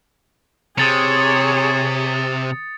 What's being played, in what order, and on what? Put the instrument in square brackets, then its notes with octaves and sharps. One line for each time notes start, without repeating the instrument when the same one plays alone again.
[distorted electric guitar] C3 [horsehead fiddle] G#4 C#5 [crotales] D#6 A6 C#7